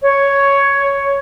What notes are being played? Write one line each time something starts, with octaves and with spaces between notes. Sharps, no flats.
C#5